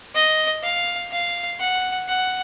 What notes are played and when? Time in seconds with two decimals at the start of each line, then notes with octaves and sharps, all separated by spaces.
0.15 D#5
0.63 F5
1.12 F5
1.60 F#5
2.08 F#5